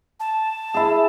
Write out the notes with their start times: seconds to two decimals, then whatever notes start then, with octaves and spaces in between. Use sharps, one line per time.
0.20 A5
0.74 E4 G#4